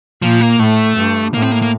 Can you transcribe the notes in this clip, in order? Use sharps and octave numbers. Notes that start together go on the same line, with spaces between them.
A#2 F3
A#3
A2 A3
G2
A2 A#3
C4
A#3
A#3